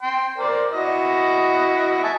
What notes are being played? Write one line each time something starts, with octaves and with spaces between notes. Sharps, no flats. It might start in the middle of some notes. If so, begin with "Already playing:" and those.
G5 C6
A#4 C5 D5
E4 F#4 D#5
E5 G#5 A5